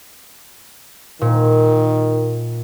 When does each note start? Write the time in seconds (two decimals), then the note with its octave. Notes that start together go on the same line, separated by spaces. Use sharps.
1.21 A#2 D#3